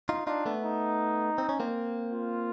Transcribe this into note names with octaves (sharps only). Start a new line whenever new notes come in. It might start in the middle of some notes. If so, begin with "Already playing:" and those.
D#4 F4
D4 D#4 F4
A3 B3
D#4
C4
C#4
A#3 C4
F4